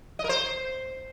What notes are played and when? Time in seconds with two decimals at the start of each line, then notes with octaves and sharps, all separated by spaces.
0.19 D#5
0.24 A#4
0.29 C5